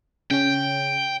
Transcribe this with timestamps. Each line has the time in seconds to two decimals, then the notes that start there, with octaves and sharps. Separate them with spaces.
0.31 C#3 C#4 G5